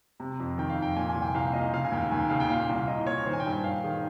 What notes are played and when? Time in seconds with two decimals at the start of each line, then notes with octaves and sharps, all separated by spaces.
0.20 C3
0.40 F2
0.58 D#3 G5
0.70 F5
0.78 F2 G5
0.96 A#2 G#5
1.09 G#5
1.15 C2
1.22 G5
1.34 C2 F5
1.53 A#2 D#5
1.73 C#3 F5
1.85 G#5
1.92 D#2 G5
2.11 D#2 G#5
2.20 G5
2.30 C#3 F5
2.40 G5
2.50 A#2 F5
2.69 C2
2.88 C2 D#5
3.07 A#2 C#5
3.26 D#3 C5
3.33 G#5
3.40 G5
3.46 G2
3.51 G5
3.64 G2 F5
3.84 D#3 G#4